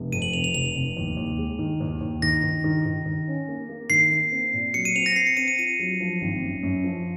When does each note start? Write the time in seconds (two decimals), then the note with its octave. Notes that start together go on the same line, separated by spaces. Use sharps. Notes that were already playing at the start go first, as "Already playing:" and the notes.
Already playing: F1
0.12 F2 D#7
0.22 F#7
0.33 F1 F7
0.44 F7
0.54 F1 F7
0.75 F1
0.97 D#2
1.17 D#2
1.38 G#3
1.59 D#3
1.80 D#2
2.01 D#2
2.22 D#3 A#6
2.43 D#3
2.64 D#3
2.86 D#3
3.06 D#3
3.28 C#4
3.48 A#3
3.69 A#3
3.90 D#3 C7
4.11 A#3
4.32 C4
4.53 A#2
4.74 F#3 C#7
4.85 D#7
4.95 C4 F7
5.06 A#6
5.16 C4 C7
5.27 C#7
5.37 C4 D#7
5.48 D#7
5.58 F4 D#7
5.79 F#3
6.00 F3
6.21 G#1
6.42 F#2
6.63 F#2
6.84 F3